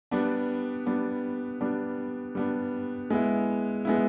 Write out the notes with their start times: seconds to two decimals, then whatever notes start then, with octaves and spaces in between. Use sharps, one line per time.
0.11 G3 B3 D4
0.86 G3 B3 D4
1.61 G3 B3 D4
2.35 G3 B3 D4
3.10 G#3 B3 E4
3.85 G#3 B3 E4